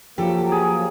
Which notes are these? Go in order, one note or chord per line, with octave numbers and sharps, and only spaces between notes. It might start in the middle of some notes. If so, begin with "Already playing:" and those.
F3 F#3 A#3 G4 A4
G#4